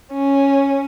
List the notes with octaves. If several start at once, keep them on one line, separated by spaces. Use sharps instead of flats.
C#4